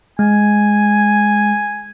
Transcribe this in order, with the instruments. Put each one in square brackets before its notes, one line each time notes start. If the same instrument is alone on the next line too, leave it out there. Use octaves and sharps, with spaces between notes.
[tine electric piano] G#3 [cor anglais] G#5